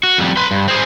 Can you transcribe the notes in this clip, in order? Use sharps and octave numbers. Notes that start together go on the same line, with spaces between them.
F#4
F2 G3
B4 C6
G2
C4 G#4